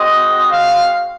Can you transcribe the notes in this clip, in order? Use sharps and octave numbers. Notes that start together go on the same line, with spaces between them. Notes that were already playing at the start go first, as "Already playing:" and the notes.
Already playing: G#3 C4 F#4 D#5
F5